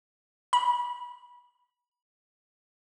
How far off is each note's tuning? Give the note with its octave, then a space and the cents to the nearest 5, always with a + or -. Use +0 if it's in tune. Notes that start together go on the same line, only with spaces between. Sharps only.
B5 -25